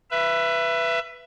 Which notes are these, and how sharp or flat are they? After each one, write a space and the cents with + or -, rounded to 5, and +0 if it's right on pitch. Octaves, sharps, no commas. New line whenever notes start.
B4 +0 E5 +25